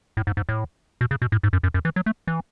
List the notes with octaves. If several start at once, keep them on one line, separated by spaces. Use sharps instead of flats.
A2
G#2
G#2
A2
B2
C#3
B2
A2
G#2
F#2
F#2
F#2
E3
F#3
A3
E3